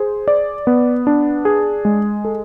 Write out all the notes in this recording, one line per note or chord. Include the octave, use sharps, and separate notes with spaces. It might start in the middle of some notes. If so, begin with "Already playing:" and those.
Already playing: G#4 C5
D5
B3
D4
G#4
G#3
A4